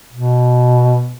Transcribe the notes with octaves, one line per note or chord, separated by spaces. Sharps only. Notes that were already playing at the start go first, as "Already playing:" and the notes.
B2